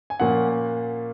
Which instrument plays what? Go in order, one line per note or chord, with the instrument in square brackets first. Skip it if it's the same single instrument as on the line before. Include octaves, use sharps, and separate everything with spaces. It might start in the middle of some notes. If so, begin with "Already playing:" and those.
[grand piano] G#5
A#2 F3 A#3 C#4 F#5